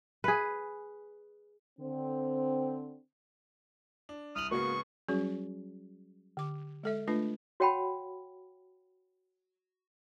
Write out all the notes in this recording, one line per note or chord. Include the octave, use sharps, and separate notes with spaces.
G#4 B4
D3 C4
D4
C2 D#6 F6 F#7
G#2 C#3 A#3 B3 F#4 C#6
F#3 G3 C#4 F#4 G#4
D3 D6
G#3 A4 E5
A3 D4 F4 B4
F#4 C#5 F#5 G5 A5 B5